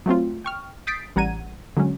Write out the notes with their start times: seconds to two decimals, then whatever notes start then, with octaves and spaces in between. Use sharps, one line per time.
0.06 F#3 A3 C4 F4
0.44 G5 C#6 F6
0.87 D#6 G6 A6 B6 C7 D7
1.16 A1 G3 F#5 A#5 G#6 D#7
1.77 D3 F#3 G#3 C#4